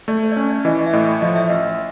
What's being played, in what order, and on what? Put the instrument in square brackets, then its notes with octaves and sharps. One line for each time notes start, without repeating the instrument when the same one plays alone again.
[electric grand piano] A3 [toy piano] D5
[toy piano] C5
D5
[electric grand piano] C#4 [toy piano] C#5
[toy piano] D5
[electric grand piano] E3 [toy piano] D#5
[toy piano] D#5
E5
[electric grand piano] A2 [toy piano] D#5
[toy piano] D5
[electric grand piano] F3 [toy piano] D#5
[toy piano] E5
[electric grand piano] A1 [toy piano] D#5